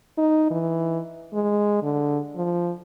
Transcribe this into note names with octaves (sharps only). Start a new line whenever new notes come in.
D#4
E3
G#3
D3
F3